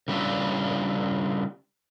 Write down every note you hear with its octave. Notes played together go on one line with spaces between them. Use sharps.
C#3 G3 D4 E4 F4